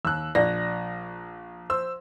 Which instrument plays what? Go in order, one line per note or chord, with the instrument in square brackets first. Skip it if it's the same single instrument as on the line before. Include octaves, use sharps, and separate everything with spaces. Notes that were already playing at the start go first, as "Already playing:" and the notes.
[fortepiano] D#2 [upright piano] E6 F#6
[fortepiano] A#1 [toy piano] D5 [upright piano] A#6
[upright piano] C5 E6